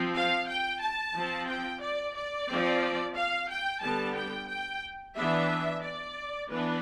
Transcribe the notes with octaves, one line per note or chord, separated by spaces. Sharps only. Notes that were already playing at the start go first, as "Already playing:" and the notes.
Already playing: F3 C4
F5
G5
A5
F3 C4
G5
D5
D5
F3 C4
F5
G5
D3 G3 B3 A5
G5
G5
E3 B3 D4 E5
D5
E3 B3 D4 B4